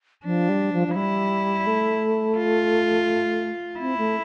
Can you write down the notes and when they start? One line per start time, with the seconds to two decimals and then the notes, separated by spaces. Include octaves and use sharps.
0.25 F3 D4
0.49 G3
0.73 F3
0.87 F3
0.96 G3 E4
1.67 A3
2.38 F4
3.80 C4 E4
3.98 A3